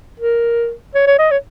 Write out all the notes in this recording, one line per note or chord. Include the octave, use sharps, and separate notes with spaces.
A#4
C#5
C#5
D#5
C#5